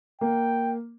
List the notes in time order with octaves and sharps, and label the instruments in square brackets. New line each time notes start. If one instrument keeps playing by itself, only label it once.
[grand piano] A#3 [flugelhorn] G5